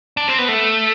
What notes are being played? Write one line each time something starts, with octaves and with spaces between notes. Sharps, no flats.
D4
C4
B3
A3